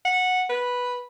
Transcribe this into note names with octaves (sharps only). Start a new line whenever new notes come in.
F#5
B4